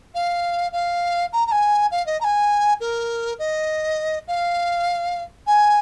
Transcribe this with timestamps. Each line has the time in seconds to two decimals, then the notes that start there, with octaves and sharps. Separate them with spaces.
0.15 F5
0.73 F5
1.33 A#5
1.47 A#5
1.52 G#5
1.91 F5
2.06 D#5
2.21 A#5
2.24 G#5
2.80 A#4
3.39 D#5
4.28 F5
5.47 G#5